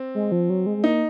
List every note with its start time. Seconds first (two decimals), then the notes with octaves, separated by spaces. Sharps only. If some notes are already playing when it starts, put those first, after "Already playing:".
Already playing: C4
0.15 G#3
0.32 F3
0.50 F#3
0.66 G#3
0.77 G#3
0.84 A#3 D#4